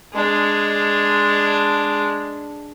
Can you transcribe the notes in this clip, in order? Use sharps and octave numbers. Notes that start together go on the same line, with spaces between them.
G#3 D4